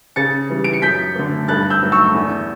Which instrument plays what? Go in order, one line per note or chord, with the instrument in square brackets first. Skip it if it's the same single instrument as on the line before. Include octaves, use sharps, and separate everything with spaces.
[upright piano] C#3 A6 C#7
E3 G3
D7
C#7
F#2 G6 B6
D3 A3
G2 F#6 A6
E6 G6
F#3 A3
C#6 E6
E2